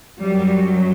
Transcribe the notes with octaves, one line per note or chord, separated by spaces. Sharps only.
F#2 F#3 G3